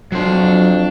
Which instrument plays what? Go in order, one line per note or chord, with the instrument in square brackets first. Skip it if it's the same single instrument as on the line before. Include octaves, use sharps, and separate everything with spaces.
[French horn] F2 [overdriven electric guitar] F#3 C6 [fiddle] D4